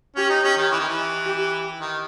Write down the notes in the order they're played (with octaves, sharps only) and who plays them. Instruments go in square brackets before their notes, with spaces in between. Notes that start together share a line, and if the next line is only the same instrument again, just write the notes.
[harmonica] C#4 [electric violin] G4
[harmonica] D#4
C#4
D#3
E3
D#3
E3
[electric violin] G4
[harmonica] D#3